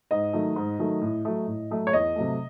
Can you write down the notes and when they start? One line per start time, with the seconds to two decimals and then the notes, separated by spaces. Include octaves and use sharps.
0.11 G#2 D#5
0.33 D#3 F#3 A3
0.56 G#2
0.79 D#3 F#3 A3
1.01 A2
1.25 F#3 A3
1.47 A2
1.71 F#3 A3
1.87 C#5
1.93 E2 D#5
2.16 C3 F#3 A3